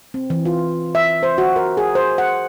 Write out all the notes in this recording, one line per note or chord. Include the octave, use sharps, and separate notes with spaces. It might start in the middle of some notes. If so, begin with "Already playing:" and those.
C4
E3
F4
E5
C5
F#4
A#4
G#4
C5
F#5